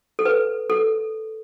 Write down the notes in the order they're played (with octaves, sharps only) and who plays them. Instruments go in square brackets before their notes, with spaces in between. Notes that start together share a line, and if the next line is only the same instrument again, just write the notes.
[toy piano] A4
B4
A4